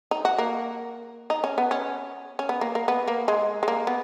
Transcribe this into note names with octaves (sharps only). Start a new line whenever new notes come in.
D#4
F#4
A#3
D#4
C#4
B3
C#4
C#4
B3
A#3
A#3
B3
A#3
G#3
G#3
A#3
B3